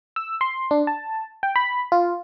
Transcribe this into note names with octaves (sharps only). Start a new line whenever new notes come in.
E6
C6
D4
A5
G5
B5
F4